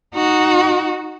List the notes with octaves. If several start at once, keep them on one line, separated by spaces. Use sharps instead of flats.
D#4 F#4